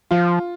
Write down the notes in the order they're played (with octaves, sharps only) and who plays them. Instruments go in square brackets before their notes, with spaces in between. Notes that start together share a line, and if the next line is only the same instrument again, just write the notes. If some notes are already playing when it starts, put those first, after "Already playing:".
[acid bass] F3 [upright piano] F4